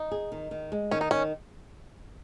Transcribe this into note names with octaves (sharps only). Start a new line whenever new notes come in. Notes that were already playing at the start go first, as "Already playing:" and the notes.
Already playing: D#4
G#4
D#3
D#3
G#3
D#3 C#4
D#4
D#3 C#4